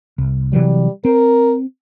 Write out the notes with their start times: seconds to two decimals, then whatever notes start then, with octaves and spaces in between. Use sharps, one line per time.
0.18 C2
0.53 C3 E3 F#3 G3
1.05 C4 A#4